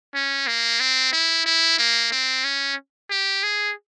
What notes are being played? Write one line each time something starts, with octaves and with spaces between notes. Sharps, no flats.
C#4
A#3
C4
E4
E4
A#3
C4
C#4
G4
G#4